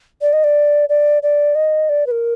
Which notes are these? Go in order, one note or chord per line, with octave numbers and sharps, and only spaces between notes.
D5
D#5
D5
D5
D5
D#5
D5
B4
A#4